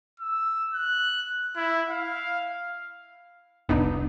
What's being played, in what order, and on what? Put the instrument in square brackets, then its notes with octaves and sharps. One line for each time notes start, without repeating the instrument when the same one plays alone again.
[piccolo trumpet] E6
F#6
E4
F5
[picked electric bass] F1 C2 [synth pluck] B3 D4 D#4